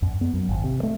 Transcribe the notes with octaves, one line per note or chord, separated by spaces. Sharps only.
F#2
B3
F#2
G#1
C3
A3